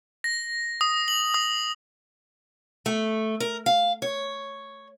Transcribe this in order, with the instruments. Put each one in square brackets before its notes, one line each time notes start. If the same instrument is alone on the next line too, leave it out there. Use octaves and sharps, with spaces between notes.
[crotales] A#6
D#6
F#7
D#6
[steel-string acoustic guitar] A3
A#4
F5
C#5